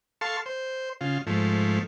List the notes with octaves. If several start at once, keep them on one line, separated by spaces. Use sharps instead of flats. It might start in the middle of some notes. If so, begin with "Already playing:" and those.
A4 F5 A5 C6 C#6
C5
C#3 F4
G#2 F3 A3